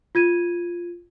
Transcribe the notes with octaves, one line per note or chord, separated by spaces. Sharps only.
F4 G#6 D#7